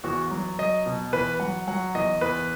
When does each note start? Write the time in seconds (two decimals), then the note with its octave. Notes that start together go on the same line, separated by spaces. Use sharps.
0.04 E2 F#4
0.31 F#3
0.59 F#3 D#5
0.86 B2
1.13 E2 B4
1.40 F#3 F#5
1.68 F#3 F#5
1.95 E2 D#5
2.21 E2 B4